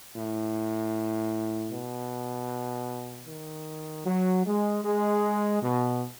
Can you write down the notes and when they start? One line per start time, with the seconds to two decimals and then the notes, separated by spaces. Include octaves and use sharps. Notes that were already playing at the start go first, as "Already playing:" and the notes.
0.15 A2
1.70 B2
3.27 D#3
4.05 F#3
4.45 G#3
4.83 G#3
5.62 B2